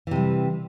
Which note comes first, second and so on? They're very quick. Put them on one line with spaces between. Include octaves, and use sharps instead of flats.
E3 C3 G3